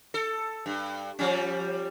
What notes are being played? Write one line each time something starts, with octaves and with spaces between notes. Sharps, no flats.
A4
G2
F3 G3 C#4